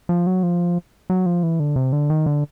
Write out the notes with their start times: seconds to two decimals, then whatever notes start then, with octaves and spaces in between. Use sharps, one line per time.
0.09 F3
0.27 F#3
0.43 F3
1.10 F#3
1.26 F3
1.43 E3
1.60 D3
1.76 C3
1.93 D3
2.10 D#3
2.26 D3